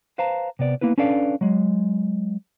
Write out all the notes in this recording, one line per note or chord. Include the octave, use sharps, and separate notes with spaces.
B4 C5 F5 A5 A#5
C3 B3 D5
A#3 B3 E4 B4
C#4 D4 A4 B4 D5 F5
F#3 G#3